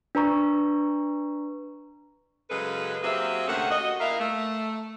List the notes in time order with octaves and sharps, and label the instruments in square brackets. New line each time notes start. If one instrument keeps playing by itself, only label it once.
[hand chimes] D4 B4 A#5 C#6
[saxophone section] F#2 C#3 G#3 A4 B4
F#3 A#3 C4 G4 G#4 E5
D2 C3 A3 A#3 C#4 F#5
F#4 D#5
A#2 E4 A#4 E5 F5
A3